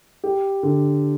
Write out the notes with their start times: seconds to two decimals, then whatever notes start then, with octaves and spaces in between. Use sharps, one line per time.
0.24 G4
0.63 D3